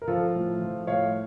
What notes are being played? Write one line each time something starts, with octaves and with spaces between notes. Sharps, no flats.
A#4
F3 F4 A4
A2
F3
A2 C#5 F5